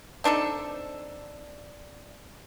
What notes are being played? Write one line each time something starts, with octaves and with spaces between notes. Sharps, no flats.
C4 D4 D#4 A4